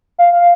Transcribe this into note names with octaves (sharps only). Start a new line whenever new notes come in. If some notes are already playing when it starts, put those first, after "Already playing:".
F5
F5